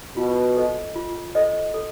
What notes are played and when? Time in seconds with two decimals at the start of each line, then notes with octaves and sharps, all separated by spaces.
0.17 B2 F4
0.56 A4 C5 D#5
0.96 F4
1.35 A4 C5 D#5
1.74 A4